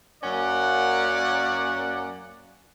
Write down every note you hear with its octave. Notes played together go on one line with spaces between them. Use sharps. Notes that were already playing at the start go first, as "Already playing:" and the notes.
F#2 A#3 C#4 D5 F#5